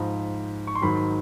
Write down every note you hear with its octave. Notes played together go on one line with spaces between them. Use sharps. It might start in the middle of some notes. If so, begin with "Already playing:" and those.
Already playing: G#2 F3 B5
C#6
C6
G#2 D#3 F#3 B5